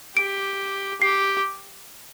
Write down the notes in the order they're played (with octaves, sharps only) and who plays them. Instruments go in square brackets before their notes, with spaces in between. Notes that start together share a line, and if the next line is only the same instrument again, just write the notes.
[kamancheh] G4 [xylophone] D7
[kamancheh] G4 [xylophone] C7